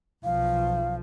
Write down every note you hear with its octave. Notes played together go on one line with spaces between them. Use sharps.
B1 F3 F5